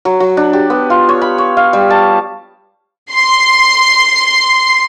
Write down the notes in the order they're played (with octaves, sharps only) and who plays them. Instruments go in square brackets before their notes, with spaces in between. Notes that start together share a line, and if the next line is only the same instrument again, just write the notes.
[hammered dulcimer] F#3
F#3
D4
G4
B3
F4
C#5
B5
C#5
F5
G3
A5
[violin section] C6 C7